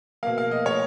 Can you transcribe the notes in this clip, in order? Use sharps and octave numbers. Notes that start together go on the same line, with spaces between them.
B2 A#3 F5
F5
D#5
C#5